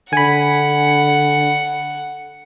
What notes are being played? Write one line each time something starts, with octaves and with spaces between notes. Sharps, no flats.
D3 F#5 G#5 B5